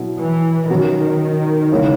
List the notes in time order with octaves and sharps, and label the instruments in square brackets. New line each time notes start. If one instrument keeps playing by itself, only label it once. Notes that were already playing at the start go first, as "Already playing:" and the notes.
Already playing: [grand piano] B2 F#3 B3 E4
[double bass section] E3
[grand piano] B2 F#3 C#4 F#4 [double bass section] D#3
[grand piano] C#3 E3 G#3 B3